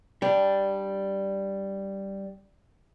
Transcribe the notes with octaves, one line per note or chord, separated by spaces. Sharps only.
G3 D4